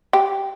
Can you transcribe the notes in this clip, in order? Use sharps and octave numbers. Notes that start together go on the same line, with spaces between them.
G4